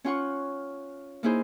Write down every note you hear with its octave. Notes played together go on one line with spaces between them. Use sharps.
C#4 F4 F#5 C#6
A#3 D#4 E4 G#4 C5